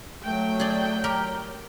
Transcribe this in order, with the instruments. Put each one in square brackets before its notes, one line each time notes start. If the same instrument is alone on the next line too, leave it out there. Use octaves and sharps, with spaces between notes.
[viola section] F#3 G5 [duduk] A3
[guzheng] G#4 D5
G4 A#4